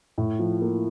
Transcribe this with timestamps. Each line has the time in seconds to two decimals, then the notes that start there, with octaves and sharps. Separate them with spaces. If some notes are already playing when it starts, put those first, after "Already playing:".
0.18 A2
0.39 F3
0.61 A#3